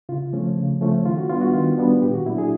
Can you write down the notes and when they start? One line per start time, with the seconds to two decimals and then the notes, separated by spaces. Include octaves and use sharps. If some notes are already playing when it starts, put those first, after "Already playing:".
0.09 C#3 F4
0.33 F3 A3 C#4
0.57 C#3
0.81 F3 A3 C#4
1.05 D#3 F4
1.17 F#4
1.29 G3 B3 D4 F4
1.41 F#4
1.53 D#3 F4
1.78 G3 B3 D4
2.02 A#2 G4
2.14 F#4
2.26 F#3 A#3 D4 E4
2.38 G#4